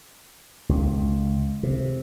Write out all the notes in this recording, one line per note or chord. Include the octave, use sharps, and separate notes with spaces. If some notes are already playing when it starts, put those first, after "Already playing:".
C#2
C3